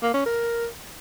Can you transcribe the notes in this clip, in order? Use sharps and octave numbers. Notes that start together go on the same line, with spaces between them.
A#3
C#4
A#4